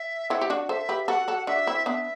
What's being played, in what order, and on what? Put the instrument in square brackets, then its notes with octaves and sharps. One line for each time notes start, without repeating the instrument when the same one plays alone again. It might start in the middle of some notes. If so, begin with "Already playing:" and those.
Already playing: [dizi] E5
[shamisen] C4 E4 [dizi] F#5
[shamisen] G4
D4 F#4
[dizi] F#5
[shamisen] A4 C5 [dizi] E5
[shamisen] G4 B4
[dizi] E5
[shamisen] F#4 A4 [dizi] F#5
[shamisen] F#4 A4
[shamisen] D4 F#4 [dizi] E5
[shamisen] C4 E4
[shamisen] B3 D4 [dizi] E5